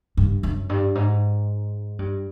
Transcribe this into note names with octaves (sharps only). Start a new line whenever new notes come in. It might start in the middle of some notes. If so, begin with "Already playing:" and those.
G2
F#2
G2
G#2
G2